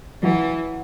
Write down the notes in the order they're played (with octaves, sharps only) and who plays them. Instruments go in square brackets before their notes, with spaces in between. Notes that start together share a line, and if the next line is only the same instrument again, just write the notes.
[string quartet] E3 [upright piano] F#3